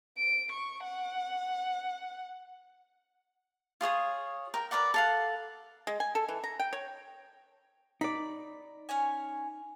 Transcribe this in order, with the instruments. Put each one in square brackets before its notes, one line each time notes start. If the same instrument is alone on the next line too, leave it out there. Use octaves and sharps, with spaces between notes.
[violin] D7
C#6
F#5
[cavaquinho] F4 G#4 C#5 D#6
A#4 G5
A#4 B4 D5 F#5
A4 F5 F#5
[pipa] G#3
G#5
A4
E3
A#5
G5
C#5
[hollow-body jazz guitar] D#4 D5 [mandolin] B5
[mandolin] C#4 C#5 G#5